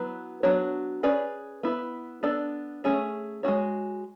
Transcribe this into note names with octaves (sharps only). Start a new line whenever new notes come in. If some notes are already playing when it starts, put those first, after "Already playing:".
Already playing: F#3 B3 E4 B4
F#3 B3 D4 F#4 C#5
C#4 G#4 B4 D5
B3 E4 B4
B3 D4 A4 D5
A3 C#4 G#4 C#5
G#3 C#4 F#4 C#5